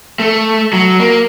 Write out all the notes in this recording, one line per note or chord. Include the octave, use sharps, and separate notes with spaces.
A3
F#3
A#3